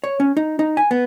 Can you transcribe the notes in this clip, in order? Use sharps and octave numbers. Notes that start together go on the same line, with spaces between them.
C#5
C#4
D#4
D#4
G#5
B3